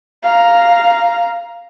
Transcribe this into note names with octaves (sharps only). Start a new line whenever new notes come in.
F5 A#5